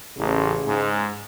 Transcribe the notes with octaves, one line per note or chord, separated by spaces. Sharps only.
A1 C#3
G#2